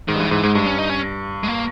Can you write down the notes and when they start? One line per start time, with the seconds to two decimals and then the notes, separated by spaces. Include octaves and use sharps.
0.08 G#2 D#3
0.15 G2
0.20 G#2 E3
0.26 D#3
0.31 G#2 E3
0.43 G#2 G#3
0.55 G2 G#3
0.66 C#4
0.78 D#4
0.89 C#4
1.44 G#3
1.48 A#3